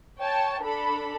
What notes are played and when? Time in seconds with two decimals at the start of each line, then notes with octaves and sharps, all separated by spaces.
0.19 C#5 G5 A5
0.61 D4 A4 B5